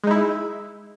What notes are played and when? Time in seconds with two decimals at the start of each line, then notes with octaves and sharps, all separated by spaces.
0.04 G#3
0.07 D#4
0.11 E4